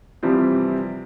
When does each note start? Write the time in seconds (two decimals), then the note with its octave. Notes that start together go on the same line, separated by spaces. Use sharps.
0.23 C3 E3 F3 G3 C4